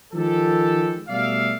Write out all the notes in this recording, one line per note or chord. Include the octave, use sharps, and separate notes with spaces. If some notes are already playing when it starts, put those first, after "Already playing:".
D#3 F3 G#3 G4 A4
B2 G3 A3 D5 E5 F5